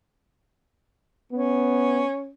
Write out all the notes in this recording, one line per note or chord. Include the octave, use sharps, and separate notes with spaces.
B3 C#4